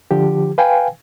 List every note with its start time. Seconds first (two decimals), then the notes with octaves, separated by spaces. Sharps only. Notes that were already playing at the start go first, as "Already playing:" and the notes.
0.11 D3 F3 G4
0.58 B4 F5 G5 G#5